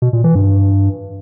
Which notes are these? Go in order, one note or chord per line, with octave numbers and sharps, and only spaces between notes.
B2
A#2
E3
G2